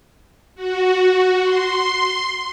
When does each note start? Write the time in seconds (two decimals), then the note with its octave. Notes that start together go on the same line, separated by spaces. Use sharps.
0.55 F#4
1.43 C6